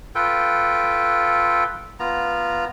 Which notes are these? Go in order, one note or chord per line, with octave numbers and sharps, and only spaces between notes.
F4 A4 B4 G5
B3 F4 A#5